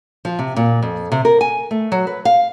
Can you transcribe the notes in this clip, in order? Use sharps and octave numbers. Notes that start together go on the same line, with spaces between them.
F3
C3
A#2
F2
C3
A#4
G#5
A3
F#3
B4
F5